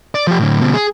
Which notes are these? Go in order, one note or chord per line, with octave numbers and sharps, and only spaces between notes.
D5
F3 G4
A2 D3
D2 B2
G#4